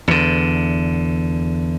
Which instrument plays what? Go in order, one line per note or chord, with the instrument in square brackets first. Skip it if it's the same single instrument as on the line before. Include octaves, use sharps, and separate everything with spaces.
[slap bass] E2 D3